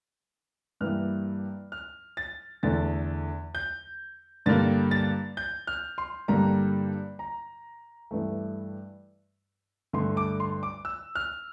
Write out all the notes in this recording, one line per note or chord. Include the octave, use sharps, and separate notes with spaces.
G2 E3 G3 A#3 F6
F6
A6
E2 D3 A3 A6
G6
G2 D3 G3 A#3 A6
A6
G6
F6
C6
G2 D3 G3 A#3 A#5
A#5
G2 E3 A3
G2 D3 A3 C6
D6
C6
D6
E6
F6